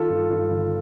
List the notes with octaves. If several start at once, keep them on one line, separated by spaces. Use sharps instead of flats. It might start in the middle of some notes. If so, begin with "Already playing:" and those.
Already playing: D#3 F4 A4
G2
G2
G1